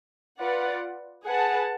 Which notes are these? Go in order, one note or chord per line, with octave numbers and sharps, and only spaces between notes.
F4 B4 D5 F#5
G#4 B4 F#5 A5